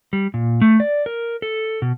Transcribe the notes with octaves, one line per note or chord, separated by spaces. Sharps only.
G3
A#2
A3
D5
A#4
A4
B2